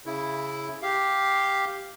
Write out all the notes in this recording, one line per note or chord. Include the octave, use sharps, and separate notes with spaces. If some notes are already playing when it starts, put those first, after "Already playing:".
C#3 E4
G4 F5